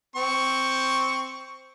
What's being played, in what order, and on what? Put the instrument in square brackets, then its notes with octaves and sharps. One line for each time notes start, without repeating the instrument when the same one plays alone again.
[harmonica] C4 C#6